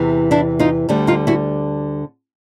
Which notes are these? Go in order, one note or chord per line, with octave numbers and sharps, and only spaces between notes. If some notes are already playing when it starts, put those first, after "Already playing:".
Already playing: E2 C3 E3
D4 E4
D#4 F4
D2 D3 G3
D#4 F4
E4 F#4